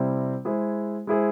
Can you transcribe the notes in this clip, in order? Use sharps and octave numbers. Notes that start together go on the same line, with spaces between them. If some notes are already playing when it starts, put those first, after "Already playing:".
Already playing: C3 G3 C4 E4
G#3 E4 G#4 C5
G#3 E4 G#4 C5